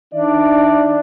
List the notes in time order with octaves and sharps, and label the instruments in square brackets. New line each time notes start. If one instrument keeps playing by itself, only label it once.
[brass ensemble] D#3 D5 E5 [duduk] D4